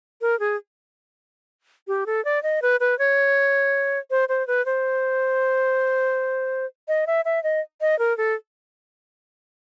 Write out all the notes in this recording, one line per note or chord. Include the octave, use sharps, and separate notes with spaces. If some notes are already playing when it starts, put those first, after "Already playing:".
A#4
G#4
G4
A4
D5
D#5
B4
B4
C#5
C5
C5
B4
C5
D#5
E5
E5
D#5
D#5
A#4
A4